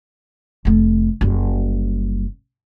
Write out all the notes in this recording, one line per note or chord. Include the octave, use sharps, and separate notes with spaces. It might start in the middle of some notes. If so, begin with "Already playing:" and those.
F1 A3
F#1 G3